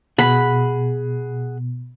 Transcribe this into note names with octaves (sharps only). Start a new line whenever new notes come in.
B2 G#4 F#5 B5